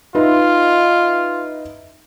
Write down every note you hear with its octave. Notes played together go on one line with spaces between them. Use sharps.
D#4 F4 B4 E5